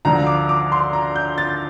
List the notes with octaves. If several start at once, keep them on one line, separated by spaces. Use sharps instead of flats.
D2 D3 F3 A#5
D6
D6
C6
A#5
G6
A6